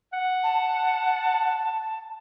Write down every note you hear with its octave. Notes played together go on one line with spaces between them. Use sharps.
F#5
A5